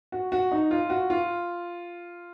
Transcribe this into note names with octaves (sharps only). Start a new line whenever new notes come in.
F#4
F#4
D#4
F4
F#4
F4